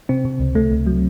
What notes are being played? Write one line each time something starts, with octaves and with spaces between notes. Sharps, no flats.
C3 C4
C3
C#2
C#2 A3
C#2
F#3